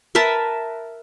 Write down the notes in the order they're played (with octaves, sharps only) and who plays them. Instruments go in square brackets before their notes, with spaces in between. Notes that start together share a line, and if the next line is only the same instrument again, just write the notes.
[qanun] A#4 B4 E5 A5